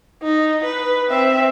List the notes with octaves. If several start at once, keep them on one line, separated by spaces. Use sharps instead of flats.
D#4
B4
C4 E5